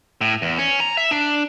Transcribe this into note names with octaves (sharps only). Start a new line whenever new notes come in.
A2
E2
C#4
A#5
E5
D4